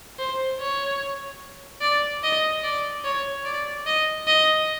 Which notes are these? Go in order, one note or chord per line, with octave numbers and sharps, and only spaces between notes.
C5
C#5
D5
D#5
D5
C#5
D5
D#5
D#5